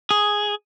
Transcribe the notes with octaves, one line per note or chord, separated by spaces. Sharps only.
G#4